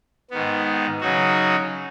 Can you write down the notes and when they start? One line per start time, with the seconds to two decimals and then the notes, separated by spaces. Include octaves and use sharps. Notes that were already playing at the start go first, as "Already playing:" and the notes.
0.31 G#2 D#3 B3
1.01 C#3 F#3 D#4 F#4